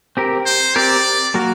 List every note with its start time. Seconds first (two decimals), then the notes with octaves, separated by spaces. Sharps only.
0.17 C4 G4 A#4
0.46 C5
0.76 C4 G4 A#4 D5
1.34 F#3 A#3 F#4 A#4